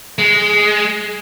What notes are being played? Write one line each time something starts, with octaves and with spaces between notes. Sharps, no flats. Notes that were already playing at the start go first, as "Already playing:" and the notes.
G#3